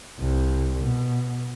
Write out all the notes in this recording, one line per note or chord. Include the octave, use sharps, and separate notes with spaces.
C2
B2